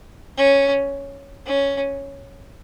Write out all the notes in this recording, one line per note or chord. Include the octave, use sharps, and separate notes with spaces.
C#4
C#4